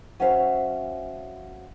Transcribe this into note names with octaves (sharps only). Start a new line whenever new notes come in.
F#3 C#4 C5 E5 F5